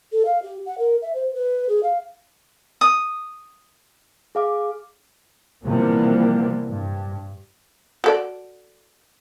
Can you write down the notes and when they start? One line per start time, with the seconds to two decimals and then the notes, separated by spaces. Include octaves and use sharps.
0.12 A4
0.26 F5
0.43 G4
0.66 F#5
0.78 A#4
1.02 E5
1.14 C5
1.34 B4
1.69 G#4
1.83 F5
2.81 D#6
4.35 G#4 F5 D6
5.66 C3 E3 F3 G3 A#3 B3
6.69 G2
8.04 F#4 A4 D5